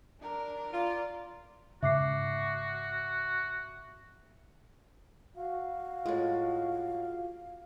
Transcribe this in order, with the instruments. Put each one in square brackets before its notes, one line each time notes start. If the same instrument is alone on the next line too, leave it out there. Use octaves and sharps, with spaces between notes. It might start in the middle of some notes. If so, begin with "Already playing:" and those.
[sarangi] D4 [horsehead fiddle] A#4
[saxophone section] F4 [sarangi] D5
[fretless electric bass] G#2 C#3 [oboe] F#4 [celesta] E5 D6 C7
[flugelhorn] F#4 [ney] F5
[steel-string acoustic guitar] A2 G#3 [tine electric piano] F4